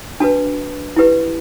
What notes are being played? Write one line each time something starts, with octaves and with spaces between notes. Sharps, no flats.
D4 F#4 B4 A5
E4 G4 B4